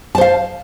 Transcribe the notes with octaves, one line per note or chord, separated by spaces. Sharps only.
C5 F5 A5